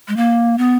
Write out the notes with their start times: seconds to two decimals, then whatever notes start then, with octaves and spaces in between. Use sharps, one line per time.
0.08 G#3
0.17 A#3
0.58 B3